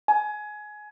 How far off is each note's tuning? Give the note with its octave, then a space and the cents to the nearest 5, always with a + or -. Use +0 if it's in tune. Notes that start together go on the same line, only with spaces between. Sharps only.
G#5 +20